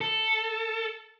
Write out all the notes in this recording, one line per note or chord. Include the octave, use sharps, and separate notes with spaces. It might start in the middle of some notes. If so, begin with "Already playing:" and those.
A4